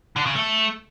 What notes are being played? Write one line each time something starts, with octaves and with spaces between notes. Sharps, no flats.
D3
C#3
A3